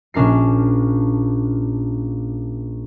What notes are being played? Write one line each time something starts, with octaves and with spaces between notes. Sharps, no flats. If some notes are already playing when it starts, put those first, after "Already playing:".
A#1 C#4 D4 A#4 C7